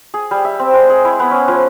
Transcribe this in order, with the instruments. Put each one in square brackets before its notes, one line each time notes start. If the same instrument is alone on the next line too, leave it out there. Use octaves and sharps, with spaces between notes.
[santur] G#4
G3
E5
C4
G#3
G#4
E4
B3
C#4
F3